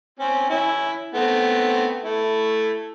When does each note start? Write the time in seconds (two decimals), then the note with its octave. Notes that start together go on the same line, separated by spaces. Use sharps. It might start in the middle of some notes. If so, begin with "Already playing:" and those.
0.20 C4 C#4
0.50 C#4 E4
1.15 A3 B3 C4
2.04 A3 E4